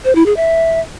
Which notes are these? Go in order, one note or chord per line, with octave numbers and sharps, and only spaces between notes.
C5
E4
G#4
E5